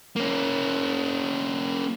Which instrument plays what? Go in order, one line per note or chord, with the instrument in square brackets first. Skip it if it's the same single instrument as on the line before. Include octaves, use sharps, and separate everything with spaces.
[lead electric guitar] A#3 C#4